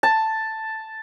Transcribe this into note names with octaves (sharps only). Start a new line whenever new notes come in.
A5